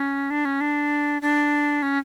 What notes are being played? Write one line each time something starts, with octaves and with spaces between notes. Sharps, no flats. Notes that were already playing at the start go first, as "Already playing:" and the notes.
Already playing: C#4
D4
C#4
D4
D4
C#4